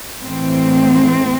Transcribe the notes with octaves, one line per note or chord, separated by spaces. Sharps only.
A2 E3 A3 C4